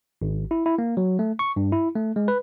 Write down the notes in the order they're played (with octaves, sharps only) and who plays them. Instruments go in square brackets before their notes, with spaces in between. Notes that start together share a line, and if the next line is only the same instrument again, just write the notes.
[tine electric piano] G#1
E4
E4
A#3
F#3
A3
C#6
G2
E4
A3
G#3
B4